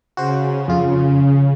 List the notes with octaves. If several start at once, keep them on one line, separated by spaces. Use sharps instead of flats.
C#3 F#4 C5
F2 F4